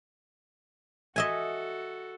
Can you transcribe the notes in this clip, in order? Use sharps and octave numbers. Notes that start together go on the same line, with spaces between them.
F#4 A4 D#5 E5 G#5